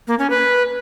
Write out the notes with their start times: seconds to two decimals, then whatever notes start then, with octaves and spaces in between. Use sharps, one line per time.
0.08 A#3
0.19 C#4
0.30 B4